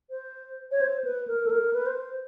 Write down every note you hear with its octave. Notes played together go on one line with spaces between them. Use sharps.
C5
C#5
C5
B4
A#4
A4
A#4
B4
C5